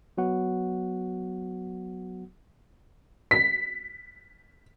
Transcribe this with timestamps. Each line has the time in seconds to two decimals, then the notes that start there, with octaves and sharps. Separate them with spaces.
0.18 F#3 B3 F#4 F#5
3.31 B6